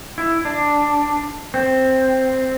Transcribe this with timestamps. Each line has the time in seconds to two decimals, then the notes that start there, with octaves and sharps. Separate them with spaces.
0.18 E4
0.45 D4
1.54 C4